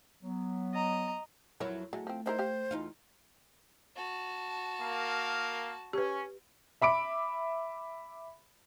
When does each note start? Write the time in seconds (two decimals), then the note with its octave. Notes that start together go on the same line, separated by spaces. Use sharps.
0.23 F#3 B3
0.74 D#5 A#5
1.60 F2 F#3 E4 A#4 C#5
1.93 F#3 G#3 A3
2.07 F3 C4
2.26 D#4 E4 A#4 C5
2.39 G4 F5
2.71 E2 D#4 F4
3.96 F#4 A5
4.81 A#3 A#4 F5
5.93 C#4 G4 B4
6.81 E5 B5 D6 D7